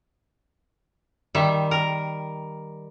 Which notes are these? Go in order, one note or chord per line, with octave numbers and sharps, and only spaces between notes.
D#3 G3 E5
A#4